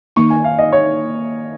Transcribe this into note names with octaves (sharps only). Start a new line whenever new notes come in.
D#3 A#3 D#4 C#6
G#5
F5
D#5
C#5